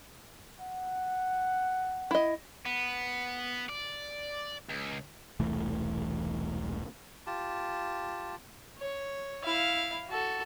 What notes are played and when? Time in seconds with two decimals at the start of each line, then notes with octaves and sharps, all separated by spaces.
0.60 F#5
2.11 E4 D#5
2.66 B3
3.69 D5
4.69 C#2
5.40 E1 C2 E3 A3
7.27 F4 G4 A5
8.79 C#5
9.43 E4 F5
10.08 F#4 A4